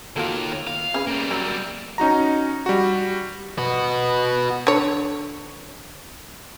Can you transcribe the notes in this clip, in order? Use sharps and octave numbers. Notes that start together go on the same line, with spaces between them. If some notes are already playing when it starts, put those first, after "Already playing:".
D#3 A#3 F4 F#4 A4
C#5
F4 F5
C#4 G#4 B4
G3 A#3
F#3 A#4
C#4 D#4 F#4 A#5
G3 F#4
F#4 B4
D3 C#5